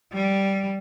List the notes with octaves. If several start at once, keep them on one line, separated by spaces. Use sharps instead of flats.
G3